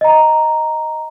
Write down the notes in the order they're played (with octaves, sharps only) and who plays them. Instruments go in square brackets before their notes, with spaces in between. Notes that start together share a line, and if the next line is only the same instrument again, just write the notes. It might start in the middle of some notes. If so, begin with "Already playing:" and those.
[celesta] D#5 A#5